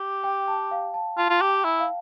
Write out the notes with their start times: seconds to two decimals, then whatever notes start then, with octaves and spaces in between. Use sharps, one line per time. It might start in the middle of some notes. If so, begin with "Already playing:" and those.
Already playing: G4
0.24 G5
0.48 A5
0.71 F5
0.94 A5
1.18 F4 A5
1.30 F4
1.41 G4
1.49 G5
1.64 E4
1.80 F5